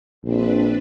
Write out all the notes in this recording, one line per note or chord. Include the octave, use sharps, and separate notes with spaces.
A#1 C4 D4 B4